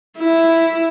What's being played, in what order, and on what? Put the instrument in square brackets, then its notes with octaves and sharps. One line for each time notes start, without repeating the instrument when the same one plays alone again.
[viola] E4